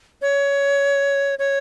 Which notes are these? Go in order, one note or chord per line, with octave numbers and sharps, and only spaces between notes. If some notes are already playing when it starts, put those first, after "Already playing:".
C#5
C#5